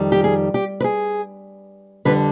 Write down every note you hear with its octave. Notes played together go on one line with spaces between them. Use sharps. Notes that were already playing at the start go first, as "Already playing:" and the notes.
Already playing: F2 D#3 G3
G4
G#4
G4
B4
G#4
F2 D3 G3 B4